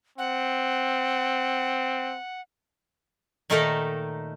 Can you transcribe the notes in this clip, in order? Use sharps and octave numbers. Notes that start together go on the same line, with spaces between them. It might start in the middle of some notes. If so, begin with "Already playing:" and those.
C4 F#5
A#2 D#3 A3 D#4 A4 A#4